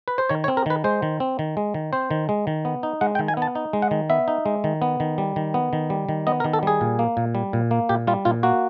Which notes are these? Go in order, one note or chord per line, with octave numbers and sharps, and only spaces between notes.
B4
C5
D#3 C#5
C#5
C4
A#4
D#3 B4
G#3 C5
D#3
C4
D#3
G#3
D#3
C4 C5
D#3
G#3
D#3
B3
D#4
G#3 F#5
G5
D#3
G#5
B3 A5
D#4
G#3
F#5
D#3
B3 E5
D#4
G#3
D#3
B3
D#3
G3
D#3
B3
D#3
G3
D#3
B3 D#5
A#4
D#3
A4
G3 G#4
A#2
A#3
A#2
G3
A#2
A#3
A#2 G4
G3 F4
A#2 F4
A#3 F#4